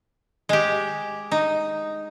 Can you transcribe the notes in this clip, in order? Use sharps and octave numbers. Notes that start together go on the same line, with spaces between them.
G#3 G4
D#4